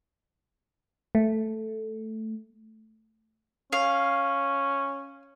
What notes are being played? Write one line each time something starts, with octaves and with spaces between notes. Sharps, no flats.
A3
C#4 F5